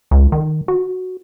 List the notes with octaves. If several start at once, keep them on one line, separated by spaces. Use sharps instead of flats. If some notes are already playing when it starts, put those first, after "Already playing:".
C#2
D#3
F#4